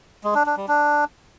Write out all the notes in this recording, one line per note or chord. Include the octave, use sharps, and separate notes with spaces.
G#3
D4
D4
G3
D4